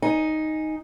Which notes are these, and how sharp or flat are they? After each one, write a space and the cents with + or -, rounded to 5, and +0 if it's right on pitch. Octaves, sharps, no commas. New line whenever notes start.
D#4 +0 G#5 +0